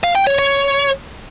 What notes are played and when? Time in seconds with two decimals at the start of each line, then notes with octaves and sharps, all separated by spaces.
0.04 F5
0.15 G5
0.27 C#5
0.39 C#5